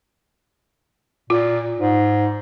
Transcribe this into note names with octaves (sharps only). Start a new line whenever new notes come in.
A#2 F4
G#2